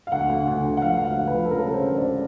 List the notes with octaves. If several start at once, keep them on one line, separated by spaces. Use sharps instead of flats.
F5
D2 F#5
D2
D2
D2
F#5
F3 F5
D2
F5
D2
B4
F3
A4
C#3 A#4
C#3
C5
D2
D5